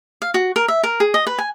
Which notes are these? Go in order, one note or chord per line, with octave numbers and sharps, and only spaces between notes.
F5
F#4
A#4
E5
A#4
G#4
D#5
B4
G#5